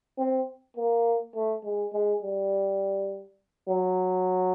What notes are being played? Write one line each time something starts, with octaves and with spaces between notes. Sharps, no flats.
C4
A#3
A3
G#3
G#3
G3
F#3